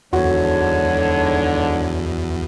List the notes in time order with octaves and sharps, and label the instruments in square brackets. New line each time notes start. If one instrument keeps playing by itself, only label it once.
[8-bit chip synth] E2 [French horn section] G#2 D3 [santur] F#4 [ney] C#5